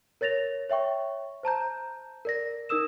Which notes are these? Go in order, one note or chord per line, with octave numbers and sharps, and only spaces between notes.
A#4 C#5 A6 A#6 F7
C#5 E5 G5 C#6
C5 A5 A#5 G6
A#4 D5 A#6
D#4 A#4 D#6 E6 E7